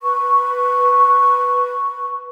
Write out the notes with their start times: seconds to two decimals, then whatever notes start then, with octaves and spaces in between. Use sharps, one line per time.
0.02 B4 C#6